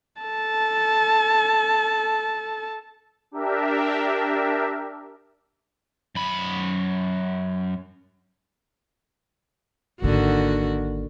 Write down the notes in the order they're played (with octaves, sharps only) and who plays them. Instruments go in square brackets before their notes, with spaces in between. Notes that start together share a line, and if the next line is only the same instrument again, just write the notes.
[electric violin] A4 A5
[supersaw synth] D4 G4 A#4 E5
[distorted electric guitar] F#2 B5
[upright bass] G#1 A#3 [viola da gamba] D3 D#3 F#4